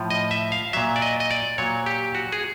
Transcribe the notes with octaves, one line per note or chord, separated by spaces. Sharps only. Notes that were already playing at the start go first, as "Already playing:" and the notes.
Already playing: A2 F3
D#5
E5
F5
A#2 F#3 E5
D5
D#5
D#5
D5
A#2 F#3 C#5
G4
F#4
G#4